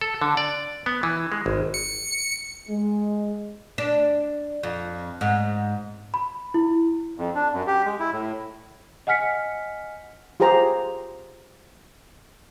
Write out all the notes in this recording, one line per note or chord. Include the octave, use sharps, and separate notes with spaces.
A4
D3
D5
B3
E3
G#3
G#1
C#7
G#3
D4
F2
G#2
B5
E4
F2
D4
F#2
G4
G#3
E4
A2
D#5 F#5 G#5 F6 B6 C#7
F4 G4 G#4 C5 A#5